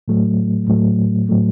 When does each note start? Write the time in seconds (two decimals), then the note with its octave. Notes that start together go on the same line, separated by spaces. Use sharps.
0.08 A2 F#3 A3
0.68 A2 F#3 A3
1.29 A2 F#3 A3